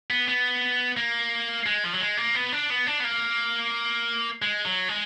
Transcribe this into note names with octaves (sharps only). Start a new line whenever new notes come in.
B3
B3
A#3
G#3
F3
F#3
G#3
A#3
B3
D4
B3
D4
B3
A#3
G#3
F#3
G#3